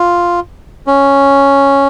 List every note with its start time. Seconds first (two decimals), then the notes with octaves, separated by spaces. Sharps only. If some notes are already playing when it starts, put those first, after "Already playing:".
Already playing: F4
0.87 C#4